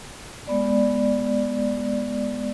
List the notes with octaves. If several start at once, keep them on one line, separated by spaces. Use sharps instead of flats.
G#3 B3 D5